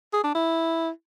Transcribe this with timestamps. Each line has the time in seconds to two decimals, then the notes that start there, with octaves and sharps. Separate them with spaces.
0.13 G#4
0.24 D4
0.35 E4